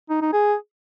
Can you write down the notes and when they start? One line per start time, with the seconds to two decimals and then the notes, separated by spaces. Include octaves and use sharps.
0.10 D#4
0.21 D#4
0.33 G#4